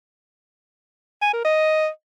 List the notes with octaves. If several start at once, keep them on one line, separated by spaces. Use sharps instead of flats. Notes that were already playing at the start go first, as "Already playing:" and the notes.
G#5
A#4
D#5